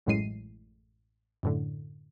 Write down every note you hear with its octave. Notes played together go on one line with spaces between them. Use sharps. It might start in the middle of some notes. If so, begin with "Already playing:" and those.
A1 F#2 A2 G#3 C7 D#7
F#2 A2 D3